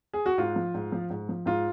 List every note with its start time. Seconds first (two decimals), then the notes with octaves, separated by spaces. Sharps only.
0.13 G#4
0.26 F#4
0.38 G#2 F4
0.56 F3
0.74 G#2
0.92 F3
1.10 G#2
1.29 F3
1.46 G#2 F4